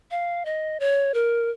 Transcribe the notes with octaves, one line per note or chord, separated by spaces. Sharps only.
F5
D#5
C#5
A#4